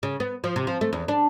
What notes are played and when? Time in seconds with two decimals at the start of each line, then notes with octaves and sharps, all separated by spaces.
0.03 C#3
0.20 B3
0.44 F3
0.56 C3
0.67 F3
0.81 A3
0.93 E2
1.08 D4